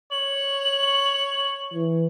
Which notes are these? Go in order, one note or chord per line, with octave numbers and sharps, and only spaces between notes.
C#5 F#7
E3